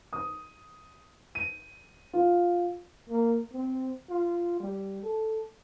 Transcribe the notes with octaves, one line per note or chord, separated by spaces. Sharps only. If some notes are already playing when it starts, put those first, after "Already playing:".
D#6
D#7
F4
A#3
C4
F4
G3
A4